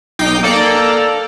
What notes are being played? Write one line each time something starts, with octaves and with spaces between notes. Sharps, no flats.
B1 D#4 G5 D6 C7
A#3 A4 D5 G5 A#5